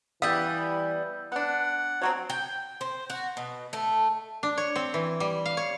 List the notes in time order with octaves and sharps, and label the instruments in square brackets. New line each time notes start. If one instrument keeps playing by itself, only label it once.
[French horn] E3 [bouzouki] G3 B3 [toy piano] F5 G5 [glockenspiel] E6 G6
[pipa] B3 D4 [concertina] F#5
[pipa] F3 F#3 C4 [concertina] F#4 C#5
[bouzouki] G5
C5
F#4
B2
A3
[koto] D4
C#5
C4
E3
G3
F5
C#5